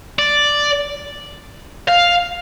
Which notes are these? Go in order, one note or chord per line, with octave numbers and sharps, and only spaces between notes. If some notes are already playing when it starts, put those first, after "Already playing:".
D5
F5